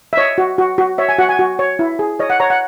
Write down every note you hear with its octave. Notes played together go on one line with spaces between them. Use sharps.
E5
C#5 D#5
F#4
F#4
F#4
C#5 E5
G#5
F#4 F#5
G#5
F#4
C#5
E4
G#4
C#5 D#5
F#5
C#5 A#5
F#5